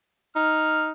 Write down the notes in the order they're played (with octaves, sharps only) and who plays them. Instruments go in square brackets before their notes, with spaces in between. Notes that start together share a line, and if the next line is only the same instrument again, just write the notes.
[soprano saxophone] D#4 [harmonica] F6